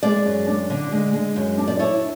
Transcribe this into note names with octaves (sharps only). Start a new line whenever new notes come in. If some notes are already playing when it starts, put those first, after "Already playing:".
G#3 D5
F#2
D4
D3
G#3
G#3
F#2
D4
D5
E4 C#5